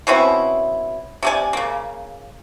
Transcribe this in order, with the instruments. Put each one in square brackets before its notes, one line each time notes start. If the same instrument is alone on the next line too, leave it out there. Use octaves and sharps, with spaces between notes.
[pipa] B2 C4 C#4 E4
C3 D5 G#5
C#3 A#3